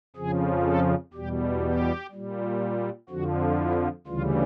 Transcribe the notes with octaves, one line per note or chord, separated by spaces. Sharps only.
F2 C#3 F3 G#4
A4
E2 B2 G3 G4
G4
A#2 G3
F2 D3 F3 F#4
E4
D2 C#3 E3 G3 F4